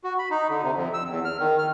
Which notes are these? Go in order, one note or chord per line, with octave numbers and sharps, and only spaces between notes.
F#4
B5
D#4
D3
C3
F2
E6
E2
F6
D#3
F6